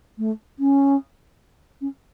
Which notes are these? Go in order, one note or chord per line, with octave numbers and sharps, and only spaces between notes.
A3
C#4
C#4